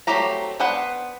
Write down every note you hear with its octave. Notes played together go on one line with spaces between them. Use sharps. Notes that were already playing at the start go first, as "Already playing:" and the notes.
F#3 A3 C4 G4 A#5
B3 D4 B4 C5 F#5